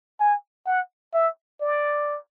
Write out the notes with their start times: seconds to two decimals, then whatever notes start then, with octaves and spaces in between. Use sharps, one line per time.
0.20 G#5
0.66 F#5
1.14 E5
1.61 D5